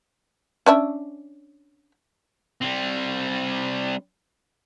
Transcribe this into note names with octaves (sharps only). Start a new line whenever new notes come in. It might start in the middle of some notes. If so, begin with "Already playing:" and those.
C#4 D4 E5
G3 C4